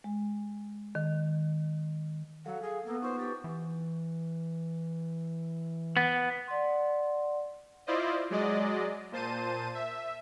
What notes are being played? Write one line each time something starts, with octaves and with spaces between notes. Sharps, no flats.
G#3
D#3
F#3 A4 F5 F#5
G#4 F5 G#6
A#3 B3 A4
D#4 F4 B4 C5 C#6
G4 A6
E3
B3
D5 F#5 C6
E4 F4 C5 D5 D#5
F#3 G#3 D5 D#5
A#2 C5 A5 D#7
E5